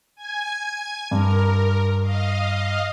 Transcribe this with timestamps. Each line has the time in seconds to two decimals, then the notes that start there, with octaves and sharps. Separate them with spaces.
0.16 G#5 G#6
1.11 G2 A#4
2.01 D#5 F5